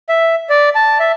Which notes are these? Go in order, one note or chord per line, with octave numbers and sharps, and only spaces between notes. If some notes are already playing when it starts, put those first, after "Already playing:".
E5
D5
A5
E5